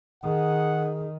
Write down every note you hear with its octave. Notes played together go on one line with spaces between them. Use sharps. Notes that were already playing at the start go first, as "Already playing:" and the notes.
D#3 G#4 F#5